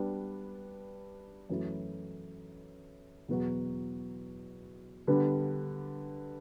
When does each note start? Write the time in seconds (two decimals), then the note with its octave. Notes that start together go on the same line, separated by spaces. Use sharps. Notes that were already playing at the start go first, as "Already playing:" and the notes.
Already playing: G3 B3 D4
1.49 F#2 E3 A3 E4
3.28 E2 B2 F#3 B3 F#4
5.07 D3 G3 B3